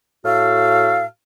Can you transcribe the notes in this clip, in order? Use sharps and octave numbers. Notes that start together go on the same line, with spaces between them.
A2 F#4 A4 F5